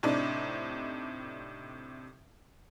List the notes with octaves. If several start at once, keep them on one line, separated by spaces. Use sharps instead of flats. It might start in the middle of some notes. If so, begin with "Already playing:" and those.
A2 C3 D4 D#4 D6